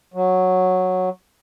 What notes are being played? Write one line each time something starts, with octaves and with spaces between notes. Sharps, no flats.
F#3